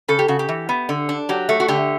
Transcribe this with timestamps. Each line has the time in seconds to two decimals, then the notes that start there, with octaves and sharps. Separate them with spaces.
0.08 C#3 A4
0.19 G4
0.28 C#3 F#4
0.39 G4
0.49 E3
0.69 B3
0.89 D3
1.09 D4
1.29 F#3 G4
1.49 A3
1.60 F#4
1.68 D3 G4